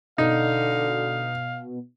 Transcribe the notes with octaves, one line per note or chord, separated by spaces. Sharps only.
B2 D3 D#4 F5